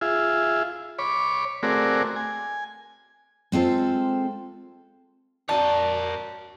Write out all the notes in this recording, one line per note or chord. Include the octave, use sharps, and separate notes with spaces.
F4 G#4 E5
C#5 B5 D6
A3 C4 F#4 G#4 A#4 D5
G#5
G#3 C4 F4 A4 C5
F#4 A#4 C#5 D5 A5